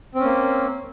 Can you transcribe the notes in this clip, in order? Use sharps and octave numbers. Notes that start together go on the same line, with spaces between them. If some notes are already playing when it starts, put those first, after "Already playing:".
A#3 C4 C#4